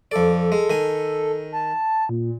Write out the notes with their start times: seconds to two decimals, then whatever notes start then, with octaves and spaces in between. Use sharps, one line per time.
0.11 F2 A4 D5
0.52 G#3
0.70 D#3 G#5
1.53 A5
2.09 A#2